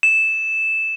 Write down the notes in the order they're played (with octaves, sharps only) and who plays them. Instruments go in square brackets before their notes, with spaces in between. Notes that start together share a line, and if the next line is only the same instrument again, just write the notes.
[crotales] E7